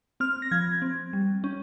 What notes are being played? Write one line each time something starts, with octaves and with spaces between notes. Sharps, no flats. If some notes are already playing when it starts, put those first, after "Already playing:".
C4 F6
A#6
F3 G#6
C4
G3
C#4